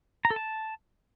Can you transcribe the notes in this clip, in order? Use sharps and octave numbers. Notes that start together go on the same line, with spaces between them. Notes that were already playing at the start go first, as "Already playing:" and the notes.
A#5
A4
A5